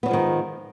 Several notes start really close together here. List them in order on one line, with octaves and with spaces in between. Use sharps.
B3 F#3 F3 G#3 D#3